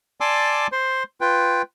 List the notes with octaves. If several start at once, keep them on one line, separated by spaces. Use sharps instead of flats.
D5 G#5 A5 C6 D6 E6
C5 C6
F4 B4 G5